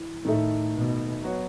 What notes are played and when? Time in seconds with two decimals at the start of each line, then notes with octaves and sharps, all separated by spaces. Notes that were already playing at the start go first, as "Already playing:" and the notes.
Already playing: E3
0.24 A2 D#3 A3 D#4 A4 E5
0.74 B2
1.22 F#3 B3 F#4 C#5